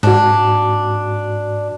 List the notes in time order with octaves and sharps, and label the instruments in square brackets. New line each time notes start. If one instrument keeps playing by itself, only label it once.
[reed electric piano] G#2 F#4 [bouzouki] D4